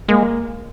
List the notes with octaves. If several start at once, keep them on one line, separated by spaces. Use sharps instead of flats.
G#3 A#3